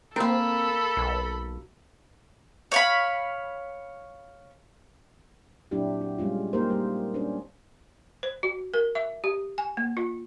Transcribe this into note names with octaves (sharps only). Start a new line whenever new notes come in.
A#3 C4 A4 A#4 B5
B1
C#5 F5 B5
A#2 F#3 C4 D4 E4 G4
F#4
G3 G#3 C#4 F4
A#3 D#4 G4 A#4 C5
G3 A#3
C#4 D4 C5
C5
F#4
A#4
E5
G4
G#5
A#3
F4